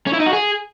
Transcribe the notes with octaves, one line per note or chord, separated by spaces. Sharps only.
C#4
E4
D#4
F#4
G#4